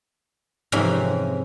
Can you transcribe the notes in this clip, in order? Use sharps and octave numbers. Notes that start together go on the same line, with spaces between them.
F2 G#2 C3 E3 C#4